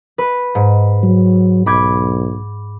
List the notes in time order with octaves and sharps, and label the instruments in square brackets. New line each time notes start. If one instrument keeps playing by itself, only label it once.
[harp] B4
G#2
[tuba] F#3
[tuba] B1 [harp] B5 D6 G#6